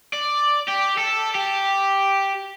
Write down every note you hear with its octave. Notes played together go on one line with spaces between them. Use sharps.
D5
G4
A4
G4